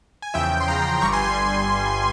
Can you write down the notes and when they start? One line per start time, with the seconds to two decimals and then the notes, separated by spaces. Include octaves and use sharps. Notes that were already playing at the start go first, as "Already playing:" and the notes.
0.22 G#5
0.34 E2 C#3 F3 E5 G5
0.60 C6
0.68 E2 C#3 F3 G5 A#5
1.01 G1 G2 G3 A#5 C#6
1.12 G#5 C6